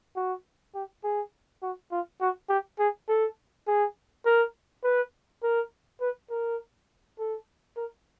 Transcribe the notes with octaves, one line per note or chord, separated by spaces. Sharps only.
F#4
G4
G#4
F#4
F4
F#4
G4
G#4
A4
G#4
A#4
B4
A#4
B4
A#4
A4
A#4